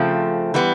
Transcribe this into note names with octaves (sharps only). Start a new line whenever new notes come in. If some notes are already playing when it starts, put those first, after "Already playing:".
Already playing: C#3 F3 A3 C4
E3 G3 B3